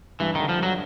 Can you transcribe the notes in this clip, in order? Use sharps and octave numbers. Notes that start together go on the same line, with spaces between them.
G2 E3
D3 D#3
F3
G2
F#3